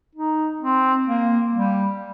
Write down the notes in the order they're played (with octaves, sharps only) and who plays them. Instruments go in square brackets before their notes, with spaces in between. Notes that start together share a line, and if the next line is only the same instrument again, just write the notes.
[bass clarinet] D#4
C4
A#3
G3